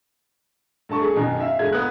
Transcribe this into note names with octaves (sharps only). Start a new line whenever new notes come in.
G2 A3 A5 C#6
G#4
F#2 B2 D#3
E5 F5
G1 G#3 G#6
B3 D#6 F#6